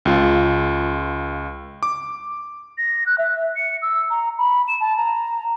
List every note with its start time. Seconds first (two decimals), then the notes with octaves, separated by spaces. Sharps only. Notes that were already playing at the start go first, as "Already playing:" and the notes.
0.05 C#2 F4
1.83 D6
2.78 A#6
3.06 F#6
3.18 E5
3.56 C#7
3.82 E6
4.10 A#5
4.38 B5
4.68 E7
4.80 A5
4.97 A#5